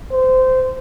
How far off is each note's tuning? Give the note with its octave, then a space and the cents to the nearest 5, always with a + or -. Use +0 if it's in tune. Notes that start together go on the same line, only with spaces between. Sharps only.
C5 -20